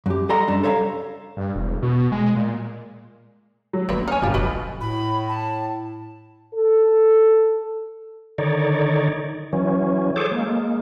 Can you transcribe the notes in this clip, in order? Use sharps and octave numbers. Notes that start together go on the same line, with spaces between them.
F#2 G4
G3 A4 D#5 F#5 A#5 C6
F#2 G3 D4
A4 C5 C#5 E5 F5 A#5
G2
E1
B2
G#3
A#2
F#3
D3 A3 A#3 C#4 B4
D#4 C#5 G#5 F6
G1 D2 B2 G3 F4 G4
F#1 F#2 F#4 B4 D#5
A2 B5
A5
A4
D3 D#3 D#4 C#5 D5
E3 F#3 C#4
G#4 A4 C5 C#5 D6
G#3 A#3